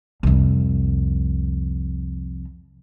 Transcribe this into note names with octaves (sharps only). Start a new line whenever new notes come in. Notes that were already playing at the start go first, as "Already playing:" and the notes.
C2 F2